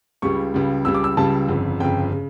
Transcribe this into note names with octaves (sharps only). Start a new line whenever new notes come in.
C#2 C#3 G3 C#6
C#2 C#3 G3
C#2 C#3 G3 E6
D6
E6
C#2 C#3 G3 A5
G1 F2 C#3
G1 F2 C#3 G5
C#3